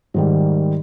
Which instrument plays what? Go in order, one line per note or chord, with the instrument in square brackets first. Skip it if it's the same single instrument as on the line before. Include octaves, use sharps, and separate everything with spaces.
[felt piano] G#2 D#3 G3